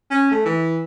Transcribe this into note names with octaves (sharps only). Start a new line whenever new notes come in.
C#4
A3
E3